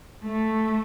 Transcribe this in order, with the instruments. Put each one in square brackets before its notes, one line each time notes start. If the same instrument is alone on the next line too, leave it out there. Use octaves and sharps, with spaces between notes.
[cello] A3